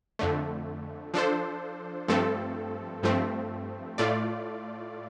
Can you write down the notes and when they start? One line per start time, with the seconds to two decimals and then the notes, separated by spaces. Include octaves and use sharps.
0.19 F2 D3 A3
1.14 F3 D4 A4 C5
2.08 G2 F3 A3 C4 A4
3.03 G2 F3 A3 C4
3.98 A2 A3 F4 D5